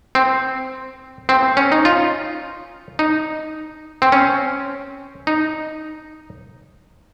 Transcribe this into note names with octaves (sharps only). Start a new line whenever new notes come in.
C4
C4
C#4
D#4
F4
D#4
C4
C#4
D#4